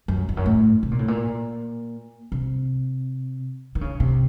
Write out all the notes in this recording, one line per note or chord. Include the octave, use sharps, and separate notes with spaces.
F#2
F2
F#2
A2
C3
A#2
A2
A#2
C3
D#3
C#3
C3